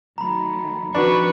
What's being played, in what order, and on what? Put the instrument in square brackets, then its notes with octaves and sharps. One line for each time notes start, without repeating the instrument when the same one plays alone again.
[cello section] D#3 F#3 A3 [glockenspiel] A#5 B5
[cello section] D#3 F3 C4 [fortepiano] D4 F#4 [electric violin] B4 C#6